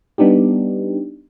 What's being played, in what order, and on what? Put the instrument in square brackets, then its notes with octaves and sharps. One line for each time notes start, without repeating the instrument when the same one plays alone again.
[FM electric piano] G3 B3 D4 D#4 G4